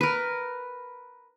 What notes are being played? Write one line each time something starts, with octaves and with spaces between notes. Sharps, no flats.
A#4 B4